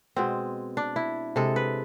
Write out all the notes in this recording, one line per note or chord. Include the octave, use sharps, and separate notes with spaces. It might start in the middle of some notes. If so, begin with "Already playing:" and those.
B2 G#3 C4
D4
E4
C3 G#3 A4
B4